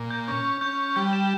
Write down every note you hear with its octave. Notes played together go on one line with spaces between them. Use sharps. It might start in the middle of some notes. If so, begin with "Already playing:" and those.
Already playing: A#2
G6
C#4
C#4 G6
G3 G6
E7